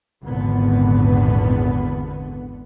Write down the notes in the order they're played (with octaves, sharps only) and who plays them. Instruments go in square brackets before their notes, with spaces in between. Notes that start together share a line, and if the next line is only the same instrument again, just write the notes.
[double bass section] G#1 E2 A#2 D3 B3